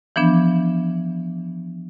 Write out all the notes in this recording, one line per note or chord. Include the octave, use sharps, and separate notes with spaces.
E3 F3 B3 D4